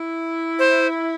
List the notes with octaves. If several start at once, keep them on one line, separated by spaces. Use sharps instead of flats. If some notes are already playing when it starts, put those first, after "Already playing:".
Already playing: E4
C5